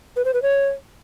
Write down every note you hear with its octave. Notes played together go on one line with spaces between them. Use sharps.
B4
C5
B4
C#5